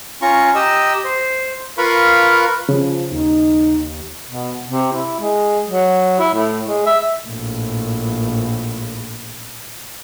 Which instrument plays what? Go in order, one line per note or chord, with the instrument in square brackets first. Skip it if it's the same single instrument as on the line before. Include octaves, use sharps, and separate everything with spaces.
[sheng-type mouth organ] C#4 F4 A#5 C#6
G4 D#5 A#5 E6
C5
F4 A#4 B4 F5 B5 C#6
[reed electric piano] C#3 [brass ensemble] F3
[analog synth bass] D#2 [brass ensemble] D#4
[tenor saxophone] B2
C3
E4
G#3
F#3
E4
A2
G#3
E5
[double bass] A#1 A2